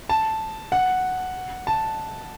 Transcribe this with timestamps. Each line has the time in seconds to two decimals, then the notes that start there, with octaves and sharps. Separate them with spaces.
0.09 A5
0.72 F#5
1.67 A5